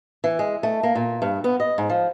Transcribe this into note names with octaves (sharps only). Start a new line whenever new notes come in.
E3
G#3
A3
A#3
A#2
G2
B3
D#5
G#2
F3